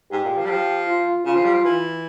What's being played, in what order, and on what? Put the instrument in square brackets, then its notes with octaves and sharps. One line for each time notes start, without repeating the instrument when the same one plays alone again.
[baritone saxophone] G#2 [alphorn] G4
[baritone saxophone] A#2
F3
G3
[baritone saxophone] F3 [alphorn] G4
[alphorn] F4
[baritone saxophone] C#3 [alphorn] F4
[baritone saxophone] F3
G3
F3
E3